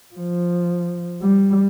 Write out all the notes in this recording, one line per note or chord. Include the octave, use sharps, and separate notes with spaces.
F3
G3